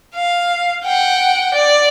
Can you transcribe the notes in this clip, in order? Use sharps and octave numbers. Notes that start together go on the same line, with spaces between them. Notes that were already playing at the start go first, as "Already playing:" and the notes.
F5
F#5 G5
D5